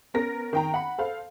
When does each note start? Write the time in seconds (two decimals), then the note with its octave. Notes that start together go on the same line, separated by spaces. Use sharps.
0.14 B3 C#4 A#4 A#6
0.53 D#3 G5 A#5
0.74 F#5 B5
0.98 A4 C5 F5